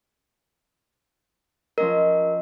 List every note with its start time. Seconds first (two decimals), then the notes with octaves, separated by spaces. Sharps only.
1.78 F3 C#4 A#4 D#5